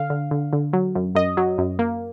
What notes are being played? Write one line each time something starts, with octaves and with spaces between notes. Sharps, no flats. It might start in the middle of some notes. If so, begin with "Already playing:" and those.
Already playing: D3 F5
D3
D3
D3
F#3
F#2
F#2 D#5
F#3
F#2
A#3